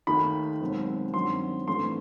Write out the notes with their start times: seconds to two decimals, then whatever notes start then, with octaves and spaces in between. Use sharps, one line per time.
0.07 D#2 D#3 A3 D#4 B5
0.61 E1 D#2 D#3 F#3 C4
1.14 G2 D#3 F#3 C4 C6
1.67 A1 G2 E3 A3 C4 C6